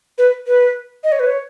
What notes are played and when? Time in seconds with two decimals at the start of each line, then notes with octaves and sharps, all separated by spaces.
0.18 B4
0.47 B4
1.04 D#5
1.12 C#5
1.20 B4
1.26 C#5